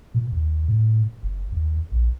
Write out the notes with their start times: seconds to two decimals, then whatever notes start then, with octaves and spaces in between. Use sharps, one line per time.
0.14 A#2
0.32 D#2
0.68 A2
1.23 F#1
1.52 D#2
1.92 A#1